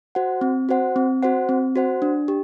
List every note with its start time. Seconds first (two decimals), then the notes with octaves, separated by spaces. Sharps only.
0.15 F#4 C5 F#5
0.41 C4
0.69 F#4 C5 F#5
0.96 C4
1.23 F#4 C5 F#5
1.49 C4
1.76 F#4 C5 F#5
2.02 D4
2.28 G4